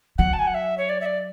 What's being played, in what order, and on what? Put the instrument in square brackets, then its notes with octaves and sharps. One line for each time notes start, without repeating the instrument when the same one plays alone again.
[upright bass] F#3 [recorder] F#5
[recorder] A5
G#5
F#5
E5
C#5
D5
E5
D5